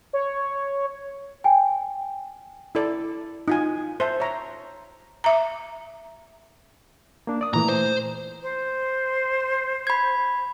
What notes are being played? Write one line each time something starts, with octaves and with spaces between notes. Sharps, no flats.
C#5
G5 G#5
E4 A4 D5
D#4 F4 G#5
C5 E5 A5
C#5 E5 A#5
E5 A#5
A#3 D4
D5 D#6
A#2 E3 A3 A#5
C5
C5
B5 G#6